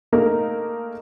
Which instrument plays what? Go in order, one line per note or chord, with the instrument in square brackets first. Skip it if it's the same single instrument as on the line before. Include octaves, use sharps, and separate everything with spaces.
[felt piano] A3 A#3 D#4 G#4 A#4